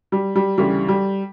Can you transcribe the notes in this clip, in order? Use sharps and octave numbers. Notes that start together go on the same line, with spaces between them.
G3
G3
D2 C#3 E3 G3
G3